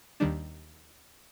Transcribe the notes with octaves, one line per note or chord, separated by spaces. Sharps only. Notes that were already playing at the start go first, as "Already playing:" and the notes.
D#2 D#3 G3 D4